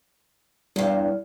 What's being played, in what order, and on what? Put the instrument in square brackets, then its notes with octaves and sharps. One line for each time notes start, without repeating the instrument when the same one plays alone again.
[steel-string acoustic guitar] E2 G2 [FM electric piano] G3 E4 F5